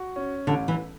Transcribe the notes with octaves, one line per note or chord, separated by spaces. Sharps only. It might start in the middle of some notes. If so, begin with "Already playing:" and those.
Already playing: F#4
C#4
A1 D3
E3